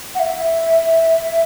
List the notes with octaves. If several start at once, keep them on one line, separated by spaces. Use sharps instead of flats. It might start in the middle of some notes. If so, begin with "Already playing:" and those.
F#5
E5